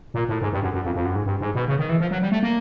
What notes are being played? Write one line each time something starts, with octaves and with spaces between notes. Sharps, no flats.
A#2
A2
G#2
G2
F#2
F#2
F2
F2
F#2
G#2
G2
G#2
B2
C#3
D#3
E3
F3
F#3
G3
A3
A#3